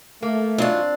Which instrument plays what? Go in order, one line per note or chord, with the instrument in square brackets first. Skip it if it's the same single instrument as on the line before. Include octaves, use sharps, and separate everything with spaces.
[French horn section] A3 [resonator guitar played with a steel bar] A#3
[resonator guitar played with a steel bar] G#2 F#3 F4 [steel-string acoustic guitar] C4 D4